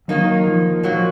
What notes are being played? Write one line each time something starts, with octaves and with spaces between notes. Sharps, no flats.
D#3 F#3 A#3 D#4
F3
A#2 F3 F#3 A#3